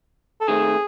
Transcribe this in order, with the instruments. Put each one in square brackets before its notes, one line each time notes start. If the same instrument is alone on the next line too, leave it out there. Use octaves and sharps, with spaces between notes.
[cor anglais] A4
[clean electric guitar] D#3 A3 C4 [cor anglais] G#4